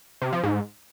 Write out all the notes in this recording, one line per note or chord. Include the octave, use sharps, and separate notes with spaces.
C3
F3
G#2